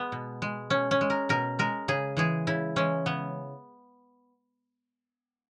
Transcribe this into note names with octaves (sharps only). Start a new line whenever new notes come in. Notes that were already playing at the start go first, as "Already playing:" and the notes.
Already playing: G#3 B3
B2
G#3
B2 C#4
C#4
G#3
A#4
B2 A#4
G#3 A#4
C#3 G#4
E3 G#3 G#4
C#3 E4
E3 G#3 C#4
C#3 B3